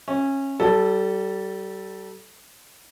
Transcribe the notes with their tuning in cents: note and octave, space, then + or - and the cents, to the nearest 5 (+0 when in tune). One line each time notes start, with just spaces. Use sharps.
C#4 -20 E5 +0
G3 -30 A4 +0